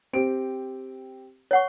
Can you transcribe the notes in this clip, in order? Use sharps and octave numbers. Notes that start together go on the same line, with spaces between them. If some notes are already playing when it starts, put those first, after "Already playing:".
C4 G4 D7
C#5 F#5 C#6